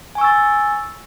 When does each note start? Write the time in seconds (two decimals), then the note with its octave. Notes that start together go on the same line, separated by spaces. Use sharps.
0.15 G#5
0.18 C#6
0.21 E6
0.24 A6